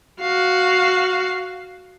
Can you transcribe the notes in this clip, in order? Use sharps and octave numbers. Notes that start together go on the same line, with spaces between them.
F#4 F5